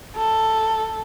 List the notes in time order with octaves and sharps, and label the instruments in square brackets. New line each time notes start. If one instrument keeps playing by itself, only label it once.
[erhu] A4